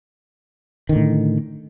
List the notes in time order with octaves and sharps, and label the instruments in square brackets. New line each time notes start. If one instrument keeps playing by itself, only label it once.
[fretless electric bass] D#3
D3
A2